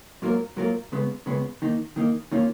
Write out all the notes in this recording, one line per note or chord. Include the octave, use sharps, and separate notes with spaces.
G#2 F#3 A#3 F4 A#4
G#2 F#3 A#3 F4 A#4
C#2 C#3 G#3 B3
C#2 C#3 G#3 B3
D#3 A#3 D#4
D#3 A#3 D#4
D#3 A#3 C#4 F4